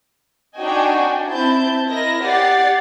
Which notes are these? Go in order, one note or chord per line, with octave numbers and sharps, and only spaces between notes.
D4 D#4 F#4 D#5 G5 G#5
C4 E4 A5 G6
E4 A#4 D#5 A#6
G4 D5 F#5 A6 C7